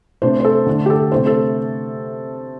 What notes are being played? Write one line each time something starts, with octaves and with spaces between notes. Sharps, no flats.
C3 A3 D4 C5
C5
A4
D3 A3 D4
G4
A4
C3 A3 D4 C5
A4